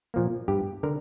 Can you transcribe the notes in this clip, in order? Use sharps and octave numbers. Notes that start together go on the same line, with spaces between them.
A#2 F3 A#3
G2 G4
D3 A#4